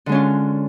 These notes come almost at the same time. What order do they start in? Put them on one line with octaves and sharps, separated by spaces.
D3 G#3 C#4 F4